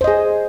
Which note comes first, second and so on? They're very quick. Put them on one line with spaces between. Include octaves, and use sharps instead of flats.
C5 D#5 G#4